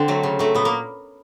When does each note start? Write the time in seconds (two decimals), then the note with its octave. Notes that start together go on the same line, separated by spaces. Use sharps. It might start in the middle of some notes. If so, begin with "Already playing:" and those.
Already playing: D3 C4
0.08 F#3 A3
0.23 C#3
0.39 F#3 A3
0.55 A#2 B3
0.65 A#3